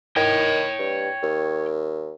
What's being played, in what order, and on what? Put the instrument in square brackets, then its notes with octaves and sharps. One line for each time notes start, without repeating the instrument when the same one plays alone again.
[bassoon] D#3 [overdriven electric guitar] C#5 G5
[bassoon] G2
D#2